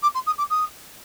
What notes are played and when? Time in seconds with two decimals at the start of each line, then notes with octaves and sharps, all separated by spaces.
0.02 D6
0.14 C6
0.26 D#6
0.38 D6
0.50 D#6